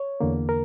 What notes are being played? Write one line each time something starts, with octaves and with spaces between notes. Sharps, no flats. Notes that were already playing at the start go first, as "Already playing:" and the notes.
Already playing: C#5
E2 D3 A#3
A#4